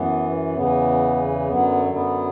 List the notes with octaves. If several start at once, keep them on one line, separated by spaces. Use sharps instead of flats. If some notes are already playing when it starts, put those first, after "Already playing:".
Already playing: F#2 E3 B3
E2 C#3 E3 B3
F#2 D3 F#3 B3
B3